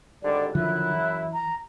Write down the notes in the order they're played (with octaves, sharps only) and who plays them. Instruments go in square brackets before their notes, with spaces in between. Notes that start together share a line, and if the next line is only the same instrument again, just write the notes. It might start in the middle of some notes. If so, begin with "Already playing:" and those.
[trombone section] G#1 D3 G3 [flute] D5
[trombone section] F#2 E4 [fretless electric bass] D3 D#3 F3 [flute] F#6
[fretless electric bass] E3
[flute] A#5